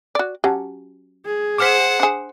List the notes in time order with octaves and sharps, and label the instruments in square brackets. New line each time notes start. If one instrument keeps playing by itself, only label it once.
[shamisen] F#4 D5
[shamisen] F#3 C#4 [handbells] G4 F#5 A5
[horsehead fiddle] G#4
[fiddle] C5 F#5 [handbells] D6 F6 B6
[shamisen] D4 G#4